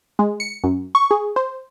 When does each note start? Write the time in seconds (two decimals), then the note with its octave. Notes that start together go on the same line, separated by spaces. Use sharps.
0.19 G#3
0.40 C#7
0.64 F#2
0.95 C#6
1.11 G#4
1.36 C5